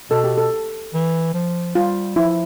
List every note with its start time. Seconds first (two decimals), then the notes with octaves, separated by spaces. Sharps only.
0.11 B2 A4
0.24 G4
0.38 A4
0.94 E3
1.34 F3
1.75 G3 F4
2.16 F3 E4